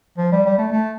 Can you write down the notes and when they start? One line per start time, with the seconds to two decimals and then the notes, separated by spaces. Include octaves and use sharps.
0.18 F3
0.32 G3
0.46 G3
0.58 A3
0.72 A3